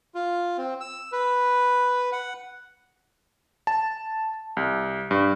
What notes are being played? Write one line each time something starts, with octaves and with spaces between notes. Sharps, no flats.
F4
C4
E6
B4
F#5
A5
C2
G2